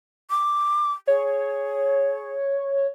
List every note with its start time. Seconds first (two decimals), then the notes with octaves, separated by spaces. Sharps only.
0.30 D6
1.07 G#4 C#5